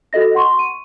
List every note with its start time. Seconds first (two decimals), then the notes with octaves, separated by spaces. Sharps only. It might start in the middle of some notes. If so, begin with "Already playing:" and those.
0.13 F#4 A4 D#5 A#6
0.35 F#5 C6 C#6
0.59 D#7